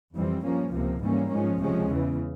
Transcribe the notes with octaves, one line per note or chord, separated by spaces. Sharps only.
F2 E3 G3 C4
G2 F3 A#3 C#4
C#2 C3 F3 A#3
G#2 E3 G3 A#3 C#4
G#2 F3 G#3 C#4
C#2 C3 F3 G#3 C#4
E2 C#3 E3